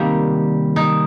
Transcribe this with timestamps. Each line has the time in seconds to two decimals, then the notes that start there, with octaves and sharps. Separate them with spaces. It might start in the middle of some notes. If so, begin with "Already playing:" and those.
Already playing: C3 D#3 G3 A#3
0.76 D#4